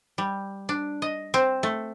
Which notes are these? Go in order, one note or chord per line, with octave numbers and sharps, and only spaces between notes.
G3
D4
D#5
C4
A3